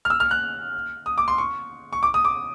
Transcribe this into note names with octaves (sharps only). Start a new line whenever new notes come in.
F6
E6
F6
F#6
D#6
D6
C6
C#6
C#6
D6
D#6
D6